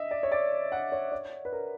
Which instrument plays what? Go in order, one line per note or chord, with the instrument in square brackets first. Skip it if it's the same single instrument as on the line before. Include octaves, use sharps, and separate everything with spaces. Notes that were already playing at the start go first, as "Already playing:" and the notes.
Already playing: [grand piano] D#5 E5
D5
C#5
D5
F#5
C#5
C#5
B4
A#4